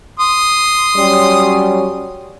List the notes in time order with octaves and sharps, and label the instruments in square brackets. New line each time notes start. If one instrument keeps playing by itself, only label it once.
[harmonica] C6 D#6
[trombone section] F#3 G3 C#4